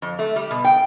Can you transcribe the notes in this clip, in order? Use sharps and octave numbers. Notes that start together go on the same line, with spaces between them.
F2
A3
G3
B2
G5